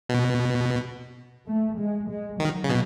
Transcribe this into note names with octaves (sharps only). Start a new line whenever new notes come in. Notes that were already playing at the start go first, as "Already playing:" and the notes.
B2
A3
G#3
G#3
D#3 F#3
C#3
B2